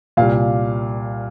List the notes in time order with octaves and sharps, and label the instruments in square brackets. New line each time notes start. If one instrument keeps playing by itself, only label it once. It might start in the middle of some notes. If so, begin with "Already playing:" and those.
[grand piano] C2 A#2 F5